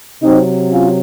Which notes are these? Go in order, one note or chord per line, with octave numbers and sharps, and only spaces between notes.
C3 F#3 C4 D#4
C#4 F4